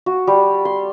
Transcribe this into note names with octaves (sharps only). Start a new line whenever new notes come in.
F#4
G3
C6